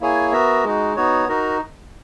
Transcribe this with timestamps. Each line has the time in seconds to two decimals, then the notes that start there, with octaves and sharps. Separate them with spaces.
0.01 A#3 E4 G#4 C#5 G#5
0.32 B3 F#4 A#4 E5
0.64 G#3 D#4 F#4
0.96 B3 D#4 F#4 C#5
1.28 D#4 F#4 A#4